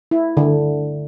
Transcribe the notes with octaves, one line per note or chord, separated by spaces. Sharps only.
E4
D3